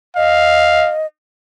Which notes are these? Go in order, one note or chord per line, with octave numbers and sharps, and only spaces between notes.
D#5 F5